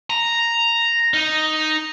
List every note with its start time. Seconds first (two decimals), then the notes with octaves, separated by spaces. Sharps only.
0.10 A#5
1.14 D#4